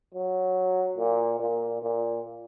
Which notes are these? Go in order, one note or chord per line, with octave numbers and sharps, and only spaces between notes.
F#3
A#2
A#2
A#2